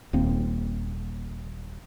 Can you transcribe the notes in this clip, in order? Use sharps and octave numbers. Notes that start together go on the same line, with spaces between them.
D#1 D#2 A#3 C4